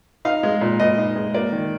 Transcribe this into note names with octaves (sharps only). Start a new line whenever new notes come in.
D#4 F5
G#3
A#2
A#2 D#5
D#4
G#3
A#3 D5
D#3